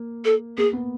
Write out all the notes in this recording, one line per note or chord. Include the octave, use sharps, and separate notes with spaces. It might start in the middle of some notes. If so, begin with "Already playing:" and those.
Already playing: A#3
A4
A#3 G#4
B3